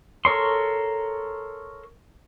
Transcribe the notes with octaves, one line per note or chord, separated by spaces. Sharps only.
A4 A#4 C#5 C6